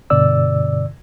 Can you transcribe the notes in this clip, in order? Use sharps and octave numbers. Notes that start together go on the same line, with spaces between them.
G2 B2 D3 D5 E6